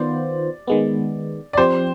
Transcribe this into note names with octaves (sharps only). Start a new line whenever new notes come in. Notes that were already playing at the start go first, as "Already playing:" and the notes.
Already playing: D#3 B3 F4 C5 D5
D#3 G#3 B3
D5
F3 C4 G4 C5